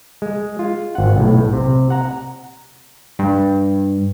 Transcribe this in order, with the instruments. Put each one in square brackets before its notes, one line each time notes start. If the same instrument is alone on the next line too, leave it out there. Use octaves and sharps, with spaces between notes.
[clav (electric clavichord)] G#3
F4
G#1 F#5
B1 A2
C3
F#5 A#5
[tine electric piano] G2